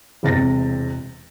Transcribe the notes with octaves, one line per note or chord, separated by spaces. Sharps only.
E1 C3 A6 A#6